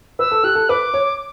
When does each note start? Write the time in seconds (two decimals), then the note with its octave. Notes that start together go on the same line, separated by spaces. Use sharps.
0.19 B4 E6
0.31 A4
0.43 G4 F#6
0.55 A4
0.69 B4 D6
0.94 C#5